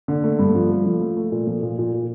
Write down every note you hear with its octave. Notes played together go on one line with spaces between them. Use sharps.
D3
A3
G2
F3
A3
F3
A3
A3
A#2
F3
A#2
A#2
A#2